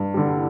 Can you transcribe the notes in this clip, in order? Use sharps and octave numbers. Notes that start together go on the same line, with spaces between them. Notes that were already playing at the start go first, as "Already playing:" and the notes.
Already playing: G2
D3 G3